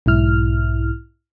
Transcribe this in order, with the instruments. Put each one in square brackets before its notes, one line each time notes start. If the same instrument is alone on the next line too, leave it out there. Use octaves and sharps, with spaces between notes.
[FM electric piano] B1 G#2 E4 F6